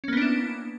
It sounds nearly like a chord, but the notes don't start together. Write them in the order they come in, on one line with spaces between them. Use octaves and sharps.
C#4 A#3 B3 D4 E4